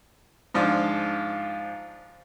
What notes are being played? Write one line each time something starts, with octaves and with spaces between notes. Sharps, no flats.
G#2 F3 D4 F4